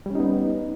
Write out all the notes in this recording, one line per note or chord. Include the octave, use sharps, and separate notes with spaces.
G3 B3 C#4 D#4